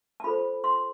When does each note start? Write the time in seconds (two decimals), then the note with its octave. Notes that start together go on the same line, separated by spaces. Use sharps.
0.20 A5
0.24 F4 A4 C5 B5
0.64 C6